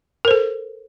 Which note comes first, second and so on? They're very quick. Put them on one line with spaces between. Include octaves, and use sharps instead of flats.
A#4 C5 A4